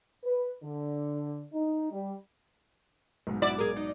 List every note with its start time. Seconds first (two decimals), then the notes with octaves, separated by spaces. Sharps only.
0.24 B4
0.63 D3
1.53 D#4
1.92 G3
3.27 B1 G#2
3.42 E4 F#4 D5
3.59 G#4 A#4
3.76 D#4